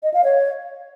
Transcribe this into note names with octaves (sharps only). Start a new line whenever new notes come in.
D#5
F5
C#5